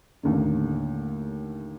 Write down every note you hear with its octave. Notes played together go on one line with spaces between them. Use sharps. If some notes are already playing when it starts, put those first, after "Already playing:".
A1 D#2 D3